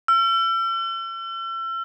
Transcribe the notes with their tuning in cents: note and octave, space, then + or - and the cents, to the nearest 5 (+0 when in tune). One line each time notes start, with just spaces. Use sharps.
E6 +40